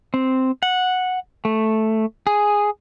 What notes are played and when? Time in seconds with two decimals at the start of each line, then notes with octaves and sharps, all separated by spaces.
0.14 C4
0.63 F#5
1.45 A3
2.27 G#4